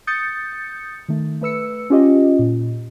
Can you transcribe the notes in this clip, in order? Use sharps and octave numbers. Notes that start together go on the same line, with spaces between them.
D#6 G6 A6 C#7
D#3 A3
A3 B4 E6 C#7
C#4 F4 G4 D#5
A#2